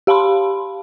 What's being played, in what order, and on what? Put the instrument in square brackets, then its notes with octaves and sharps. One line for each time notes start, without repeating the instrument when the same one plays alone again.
[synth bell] G4 F5 A5 B5 C6